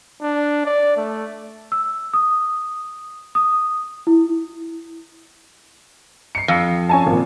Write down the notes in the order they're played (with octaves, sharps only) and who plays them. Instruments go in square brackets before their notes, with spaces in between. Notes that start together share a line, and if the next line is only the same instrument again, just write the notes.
[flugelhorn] D4
D5
A3
[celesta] E6
D#6
D#6
E4
[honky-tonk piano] C7 C#7
[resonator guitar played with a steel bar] F2
[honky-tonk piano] C#4 G#5 A5
G#1 A#2